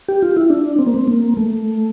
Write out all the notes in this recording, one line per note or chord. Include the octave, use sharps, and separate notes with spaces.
G4
F4
E4
D4
C4
A#3
C4
A#3
A3